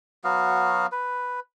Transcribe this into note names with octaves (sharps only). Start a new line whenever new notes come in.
F#3 B3 F#4 F5
B4